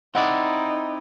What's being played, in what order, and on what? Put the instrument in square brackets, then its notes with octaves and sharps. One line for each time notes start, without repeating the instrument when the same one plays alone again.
[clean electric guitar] C4 E4 D5 [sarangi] D#4 [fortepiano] D#5 F#5